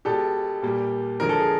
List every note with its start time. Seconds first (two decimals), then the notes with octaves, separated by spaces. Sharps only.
0.05 B2 G#3 G4 A4
0.62 A#2 G3 A#3
1.20 D3 F3 G#3 A#4
1.29 A4
1.39 G#4